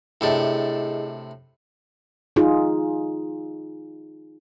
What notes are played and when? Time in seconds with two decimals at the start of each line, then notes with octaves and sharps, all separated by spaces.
0.21 A2 C3 D4 E4 G#4 D#5
2.36 D#4 F4 G#4